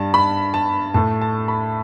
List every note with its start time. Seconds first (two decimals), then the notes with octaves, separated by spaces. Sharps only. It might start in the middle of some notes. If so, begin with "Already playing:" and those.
Already playing: G2 G3 A5
0.14 B5
0.54 A5
0.94 A2 A3 A5
1.21 A5
1.48 B5